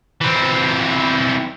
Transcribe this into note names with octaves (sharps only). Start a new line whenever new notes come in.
E3 C4